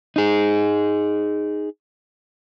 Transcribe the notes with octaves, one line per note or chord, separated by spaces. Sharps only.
D#4 G#4